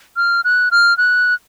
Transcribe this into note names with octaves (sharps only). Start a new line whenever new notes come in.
F6
F#6
F6
F#6